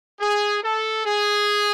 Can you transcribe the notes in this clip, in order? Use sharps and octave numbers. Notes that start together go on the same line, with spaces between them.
G#4
A4
G#4